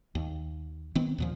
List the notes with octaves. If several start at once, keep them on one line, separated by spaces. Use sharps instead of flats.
D#2
D#3 B3 C4
D#2 A#2 F3